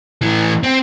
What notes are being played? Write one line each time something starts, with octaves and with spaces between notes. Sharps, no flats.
A2 E3
C4